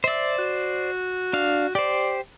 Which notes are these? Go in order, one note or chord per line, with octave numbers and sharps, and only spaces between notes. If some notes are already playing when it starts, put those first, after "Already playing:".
C5 D5 E5
F#4
D4 F5
G4 C5 D5